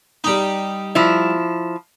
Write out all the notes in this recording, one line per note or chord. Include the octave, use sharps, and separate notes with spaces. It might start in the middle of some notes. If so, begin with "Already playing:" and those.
G3 D#4
F3 E4